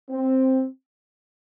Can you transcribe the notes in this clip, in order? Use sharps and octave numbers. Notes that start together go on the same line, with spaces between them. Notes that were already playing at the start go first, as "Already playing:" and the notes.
C4